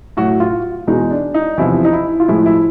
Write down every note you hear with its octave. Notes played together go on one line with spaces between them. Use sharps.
A2 F#3 F#4
F4
E2 B2 G#3 D#4
D4
D#4
E2 C3 F3 E4
D#4
E4
F4
A2 F3 G#3 E4
E4